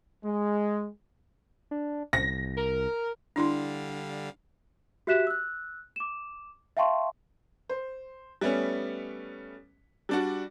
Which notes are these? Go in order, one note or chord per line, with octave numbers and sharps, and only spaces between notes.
G#3
D4
C2 A#6
A#4
D3 G3 D4 E4 F5 C6
F#4 G4 E5 F#6 B6 E7
E6 F#6
D6 E7
E5 F5 G5 A5 C6 C#6
C5
G3 A3 B3 C#4
G3 D4 F#4